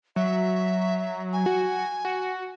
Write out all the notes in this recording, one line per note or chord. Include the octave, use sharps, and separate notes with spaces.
F#3 E5
G#5
F#4
F#4